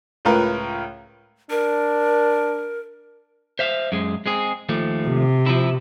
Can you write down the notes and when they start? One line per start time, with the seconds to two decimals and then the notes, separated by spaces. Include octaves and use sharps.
0.25 C#2 A2 F4 A#4 B4
1.50 D4 A#4
3.59 C5 E5 F5
3.92 F#2 G#3
4.26 G#3 C4 G#4
4.69 D#2 F3 A3
5.07 C3
5.46 F3 E4